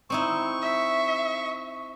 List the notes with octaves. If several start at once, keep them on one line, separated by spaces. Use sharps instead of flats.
C4 D#4 E4 C#6
E5